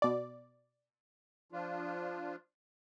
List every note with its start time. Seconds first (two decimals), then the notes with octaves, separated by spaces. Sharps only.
0.02 B2 D5
1.52 F3 D4 F4